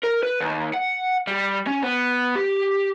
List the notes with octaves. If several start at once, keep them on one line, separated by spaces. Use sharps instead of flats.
A#4
B4
D#2
F#5
G3
C#4
B3
G4